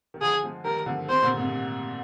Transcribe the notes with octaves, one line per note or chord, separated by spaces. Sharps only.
D#3
D3 F3 G#4
F3 G#3
D#3 G3 A#4
D3 F3
C3 D#3 C5
A#2 D3
G#2 C3